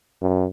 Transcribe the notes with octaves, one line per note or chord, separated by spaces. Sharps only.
F#2